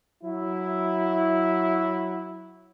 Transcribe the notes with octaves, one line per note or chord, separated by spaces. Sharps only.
F#3 E4